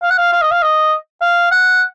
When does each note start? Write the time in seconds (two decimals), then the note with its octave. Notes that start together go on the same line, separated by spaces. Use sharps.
0.03 F5
0.11 F#5
0.18 F5
0.33 F5
0.42 D#5
0.51 F5
0.62 D#5
1.22 F5
1.52 F#5